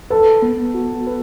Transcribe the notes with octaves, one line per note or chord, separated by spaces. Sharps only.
A4 B4
B3
F#4
B4